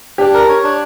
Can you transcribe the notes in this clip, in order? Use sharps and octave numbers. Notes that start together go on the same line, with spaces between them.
D4 G4
A#4
C#5
D4